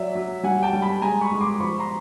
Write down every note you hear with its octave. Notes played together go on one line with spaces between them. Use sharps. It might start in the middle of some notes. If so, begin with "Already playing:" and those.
Already playing: F#3 D5 E5
F#3
G3 F#5 G#5
G5 A5
G3
A5 B5
G#3 G#5 A#5
B5 C#6
G#3
C6 D6
F3 B5 C#6
A#5 C6